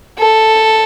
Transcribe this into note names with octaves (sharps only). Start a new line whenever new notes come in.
A4